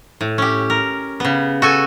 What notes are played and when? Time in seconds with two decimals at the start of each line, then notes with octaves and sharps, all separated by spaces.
0.21 A2
0.38 C#4 G4
0.70 A#4
1.20 C#3 B3
1.62 F#4 A4 G#5